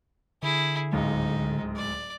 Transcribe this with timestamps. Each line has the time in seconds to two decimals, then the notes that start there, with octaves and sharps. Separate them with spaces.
0.43 D3 E4 G#4
0.93 D1 C#2 G#2 D#4
1.76 D5